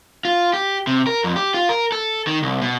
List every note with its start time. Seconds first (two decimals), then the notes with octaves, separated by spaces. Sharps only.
0.25 F4
0.54 G4
0.87 C3
1.07 A#4
1.24 F2
1.36 G4
1.54 F4
1.69 A#4
1.92 A4
2.27 D#3
2.43 C2
2.61 B2